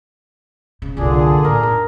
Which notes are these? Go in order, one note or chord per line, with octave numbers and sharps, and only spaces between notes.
C#3
C2 F#2 A#2 D3 D4 G#4
F2 A2 A#4
D#4